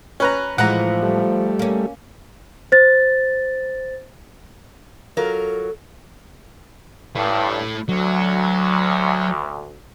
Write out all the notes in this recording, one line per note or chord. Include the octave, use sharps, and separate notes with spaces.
C#4 B4 A#5
A2 E3 F3 G#3 F#5 A#5
G3 A3
A#3 C#4
C5 A6
F#3 F4 A4 A#4
A1 G2 A3 E4
D2 F#3